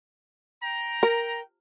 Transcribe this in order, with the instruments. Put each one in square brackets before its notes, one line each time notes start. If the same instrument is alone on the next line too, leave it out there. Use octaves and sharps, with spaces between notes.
[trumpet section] G5 A#5
[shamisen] A#4